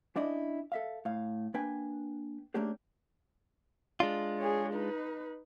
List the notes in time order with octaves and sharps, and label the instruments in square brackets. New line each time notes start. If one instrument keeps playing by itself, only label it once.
[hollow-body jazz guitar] C#4 D4 E4 D5 D#5
A4 E5 F5
A2 F5
A#3 D4 B4 G5 G#5
A3 A#3 C#4 D4 G4 G#4
[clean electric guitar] G#3 D4 F4
[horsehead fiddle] G#4 C#5
D#4 B4